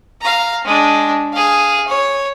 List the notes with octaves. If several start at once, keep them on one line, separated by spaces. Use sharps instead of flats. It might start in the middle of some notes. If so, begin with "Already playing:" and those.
F5 A#5
G#3 D4
G#4 F5
C#5